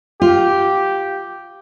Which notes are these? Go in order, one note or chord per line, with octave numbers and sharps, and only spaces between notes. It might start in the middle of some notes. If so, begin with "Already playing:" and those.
F4 G4